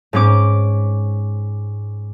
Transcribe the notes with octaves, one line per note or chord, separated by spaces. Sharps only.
G#2 C#4 D6